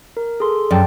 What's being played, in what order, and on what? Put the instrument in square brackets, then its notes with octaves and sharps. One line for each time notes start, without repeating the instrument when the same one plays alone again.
[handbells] A#4
G#4 A4 C6
[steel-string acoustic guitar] F#2 [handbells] D5 G5 A5